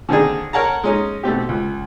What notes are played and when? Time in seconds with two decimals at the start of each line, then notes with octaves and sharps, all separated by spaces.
0.09 D3 D#3 C4 D4 D#4 G#4
0.53 A#4 C#5 F#5 A5 A#5
0.83 G#3 C#4 D#4
1.23 B2 A3 C4 G4
1.49 C#2